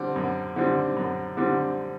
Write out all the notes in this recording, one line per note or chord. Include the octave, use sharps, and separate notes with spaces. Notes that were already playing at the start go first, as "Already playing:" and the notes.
Already playing: D3 G3 C4
F#2
D3 G3 C4
F#2
D3 G3 C4